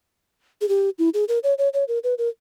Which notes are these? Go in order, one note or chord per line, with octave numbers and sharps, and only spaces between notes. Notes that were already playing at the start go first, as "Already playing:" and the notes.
G#4
G4
E4
G#4
A#4
C#5
C#5
C#5
A#4
B4
A#4